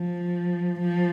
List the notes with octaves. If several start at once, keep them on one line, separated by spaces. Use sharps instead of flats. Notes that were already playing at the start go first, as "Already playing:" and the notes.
Already playing: F3
F3